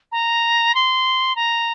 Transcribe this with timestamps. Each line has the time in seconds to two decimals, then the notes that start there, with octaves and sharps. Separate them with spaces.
0.12 A#5
0.75 C6
1.35 A#5